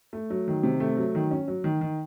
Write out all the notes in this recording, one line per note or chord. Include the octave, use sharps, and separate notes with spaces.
A3
F#3
D#3
C3
A3
F#3
D#3
C#4
F#3
D#3
D#3